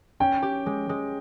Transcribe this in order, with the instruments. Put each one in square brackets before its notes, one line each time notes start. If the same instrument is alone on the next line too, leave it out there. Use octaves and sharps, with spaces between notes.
[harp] C#4 [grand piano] G5
[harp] G4
G#3
G#3